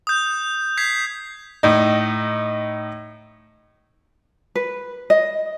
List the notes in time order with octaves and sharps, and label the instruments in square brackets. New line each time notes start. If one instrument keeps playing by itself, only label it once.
[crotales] D#6 G6
G6 G#6 B6 C7
[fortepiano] A2 D#4
[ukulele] B4
D#5